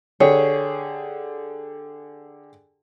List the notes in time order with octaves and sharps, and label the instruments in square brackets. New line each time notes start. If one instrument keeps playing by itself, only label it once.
[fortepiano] D3 G4 G#4 [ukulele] C#5